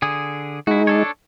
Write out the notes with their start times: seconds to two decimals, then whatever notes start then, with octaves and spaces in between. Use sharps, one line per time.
0.02 D3 G#4
0.67 G#3 D#4 E4 F#4
0.87 D4 A4 C#5